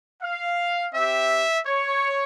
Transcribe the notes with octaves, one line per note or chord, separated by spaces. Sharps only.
F5
C4 G4 E5
C#5